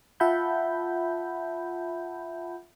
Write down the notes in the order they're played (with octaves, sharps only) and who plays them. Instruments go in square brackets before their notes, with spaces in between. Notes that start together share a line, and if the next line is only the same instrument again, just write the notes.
[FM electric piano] F4 E5 F#5 A5 B5 G6